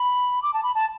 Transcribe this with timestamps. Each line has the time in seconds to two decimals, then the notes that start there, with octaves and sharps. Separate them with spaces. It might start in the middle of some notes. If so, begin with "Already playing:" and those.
Already playing: B5
0.43 D6
0.54 A5
0.63 B5
0.75 A5